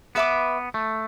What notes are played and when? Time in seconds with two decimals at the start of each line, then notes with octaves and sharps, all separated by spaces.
0.15 B3 B4 E5 B5 D6
0.74 A3